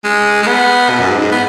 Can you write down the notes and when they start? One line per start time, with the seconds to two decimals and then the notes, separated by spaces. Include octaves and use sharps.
0.04 G#3
0.43 G#3
0.47 B3
0.90 B2
0.99 F#2
1.10 G#2
1.21 G#2
1.32 B3